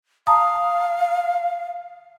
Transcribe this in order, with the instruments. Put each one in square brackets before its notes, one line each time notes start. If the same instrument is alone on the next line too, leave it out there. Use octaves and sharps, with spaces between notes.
[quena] F5 [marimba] A5 A#5 D#6